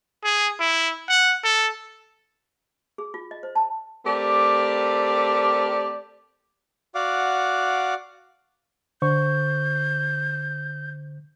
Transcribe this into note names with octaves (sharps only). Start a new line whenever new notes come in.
G#4
E4
F#5
A4
G#4
F4
D#5
C5
A5
A3 C4 G4 A#4 D5
F#4 D5 F5 F#5 D6
D3 C5 C#6 G6